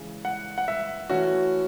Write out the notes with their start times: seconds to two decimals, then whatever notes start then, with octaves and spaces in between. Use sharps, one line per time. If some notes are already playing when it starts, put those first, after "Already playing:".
Already playing: C#3 E3 G#3
0.25 F#5
0.58 F#5
0.68 E5
1.10 E3 A3 C#4 F#4